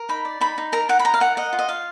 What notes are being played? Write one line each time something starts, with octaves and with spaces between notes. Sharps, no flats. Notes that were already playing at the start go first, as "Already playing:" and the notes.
Already playing: A#4
D#4 B5
D5
D#4 B5
D#4
A#4 A#5
D#4 F#5
B5
D#4 A#5
F5
A#4 F#5
D#5 F#5
F4
D#5
F4 F5